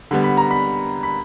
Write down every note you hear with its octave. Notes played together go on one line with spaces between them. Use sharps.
D3 G3 B3
B5
A#5
B5
B5